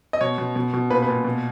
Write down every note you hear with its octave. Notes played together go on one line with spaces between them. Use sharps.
D#5
B2 C#5
B2
B2
B2
A#2 B4
B4
A#2
B2